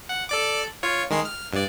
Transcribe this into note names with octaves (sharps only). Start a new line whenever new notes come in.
F#5
A4 D5 D6
F4 C#5
D#3 G#3 C7
F6
G2 D5